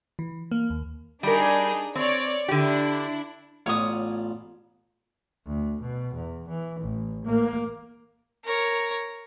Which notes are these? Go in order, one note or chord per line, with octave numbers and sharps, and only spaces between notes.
E3
A#3
D#2
G3 D4 D#4 G#4 A#4
C4 C#5 D5
D3 D4 E4 G4
A1 B3 F4 C#5 D5 D#6
D2
B2
E2
E3
A1
A#3
A#4 C#5